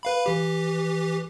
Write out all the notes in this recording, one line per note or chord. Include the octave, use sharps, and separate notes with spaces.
B4 F5 B5
E3 G4